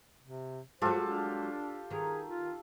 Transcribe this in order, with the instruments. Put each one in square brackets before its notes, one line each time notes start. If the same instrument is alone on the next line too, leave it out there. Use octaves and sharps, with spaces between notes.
[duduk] C3
[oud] F#3 G#3 [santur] F4 G4 A4 [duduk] C5
[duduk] D4
[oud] D#3 A#4 [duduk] G#4
[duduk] F4